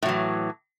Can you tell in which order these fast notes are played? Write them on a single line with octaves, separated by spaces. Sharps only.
A2 F#3 E3